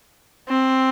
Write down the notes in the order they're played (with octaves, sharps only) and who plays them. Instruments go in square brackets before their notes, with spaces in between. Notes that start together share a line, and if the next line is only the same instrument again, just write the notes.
[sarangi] C4